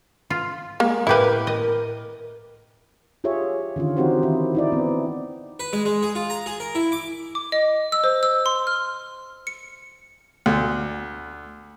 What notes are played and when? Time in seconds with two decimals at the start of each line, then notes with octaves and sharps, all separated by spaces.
0.30 F4
0.80 G#3 A#3
1.07 A2 E4 G4 A#4 B4 G5
1.47 A#4 D#5
3.24 F4 G4 G#4 C#5 E5
3.76 D3 D#3 C#4 F4
3.97 E3 C4 D#4 F#4 G4 C5
4.23 D#3 E4 G4
4.55 D#4 E4 D5
4.72 B3 C4
5.60 B4
5.73 G#3
5.85 G#3
6.03 G#4
6.15 F4
6.30 A#5
6.46 G#4
6.60 A#4
6.75 E4
6.92 D6
7.35 D6
7.52 D#5
7.92 E6
8.04 C5
8.23 E6
8.46 C6
8.67 F6
9.47 C#7
10.46 D2